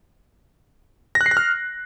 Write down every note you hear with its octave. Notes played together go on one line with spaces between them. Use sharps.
A#6
F#6
C7
A#6
F6